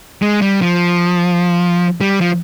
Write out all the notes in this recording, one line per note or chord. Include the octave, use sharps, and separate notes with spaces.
G#3
G3
F3
G3
F3